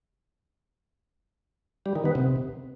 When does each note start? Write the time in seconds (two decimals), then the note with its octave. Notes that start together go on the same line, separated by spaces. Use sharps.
1.86 G3
1.96 D#3
2.05 B3
2.15 C3